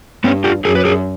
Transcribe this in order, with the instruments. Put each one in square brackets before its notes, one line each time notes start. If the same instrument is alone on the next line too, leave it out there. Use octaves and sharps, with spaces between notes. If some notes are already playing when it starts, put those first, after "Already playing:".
[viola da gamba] G2 [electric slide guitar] B3 C#4
[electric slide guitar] F4 G4
[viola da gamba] F#2 [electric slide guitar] G#4 A#4
[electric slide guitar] B4
G#4 A#4